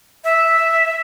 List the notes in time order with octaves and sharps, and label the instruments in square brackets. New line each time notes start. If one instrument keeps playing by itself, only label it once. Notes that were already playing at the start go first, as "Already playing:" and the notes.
[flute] E5